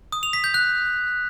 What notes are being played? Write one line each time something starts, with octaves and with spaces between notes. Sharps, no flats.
D#6
F7
B6
G6
F#6